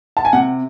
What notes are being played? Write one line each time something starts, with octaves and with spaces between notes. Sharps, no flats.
A5
G#5
C3 F#5